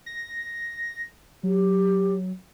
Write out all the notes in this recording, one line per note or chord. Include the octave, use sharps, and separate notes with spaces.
A#6
F#3 G4